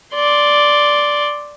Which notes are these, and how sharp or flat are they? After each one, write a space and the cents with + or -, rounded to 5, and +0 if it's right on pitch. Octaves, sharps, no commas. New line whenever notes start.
D5 +0 C6 +0